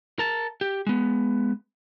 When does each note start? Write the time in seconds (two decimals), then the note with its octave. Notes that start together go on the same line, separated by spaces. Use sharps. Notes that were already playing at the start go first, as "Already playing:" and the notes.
0.19 A#4 A5
0.61 G4
0.87 G#3 B3